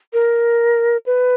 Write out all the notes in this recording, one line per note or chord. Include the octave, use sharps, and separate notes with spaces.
A#4
B4